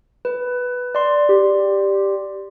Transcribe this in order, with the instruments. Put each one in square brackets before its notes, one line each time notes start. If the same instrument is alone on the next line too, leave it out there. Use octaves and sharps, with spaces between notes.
[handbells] B4
D5 C6
[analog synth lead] G4